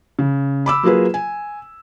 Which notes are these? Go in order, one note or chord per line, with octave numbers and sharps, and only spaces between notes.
C#3
B5 D6 E6
F#3 A#3 F4 G#4 B4
G#5